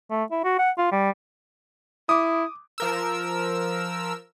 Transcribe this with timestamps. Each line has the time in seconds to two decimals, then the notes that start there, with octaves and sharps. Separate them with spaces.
0.11 A3
0.31 E4
0.44 F#4
0.59 F#5
0.78 F4
0.92 G3
2.09 E4 D6 D#6
2.78 F3 A#4 E6